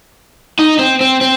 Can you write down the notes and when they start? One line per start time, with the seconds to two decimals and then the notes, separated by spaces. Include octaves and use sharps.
0.59 D#4
0.79 C4
1.01 C4
1.21 C4